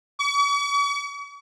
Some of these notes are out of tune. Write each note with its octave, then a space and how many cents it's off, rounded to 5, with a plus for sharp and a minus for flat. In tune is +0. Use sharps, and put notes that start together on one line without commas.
C#6 +45